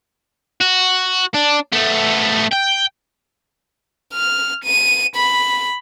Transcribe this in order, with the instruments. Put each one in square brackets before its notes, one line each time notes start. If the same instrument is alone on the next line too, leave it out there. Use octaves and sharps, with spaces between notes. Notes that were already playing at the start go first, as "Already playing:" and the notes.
[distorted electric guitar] F#4
D4
A3 B3
G5
[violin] F6
D#7
B5